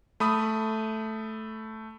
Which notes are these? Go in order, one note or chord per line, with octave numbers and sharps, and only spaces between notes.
A3 B5 D#6